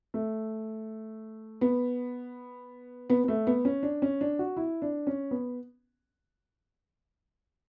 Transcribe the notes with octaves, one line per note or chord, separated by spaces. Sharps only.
A3
B3
B3
B3
A3
B3
C#4
D4
C#4
D4
F#4
E4
D4
C#4
B3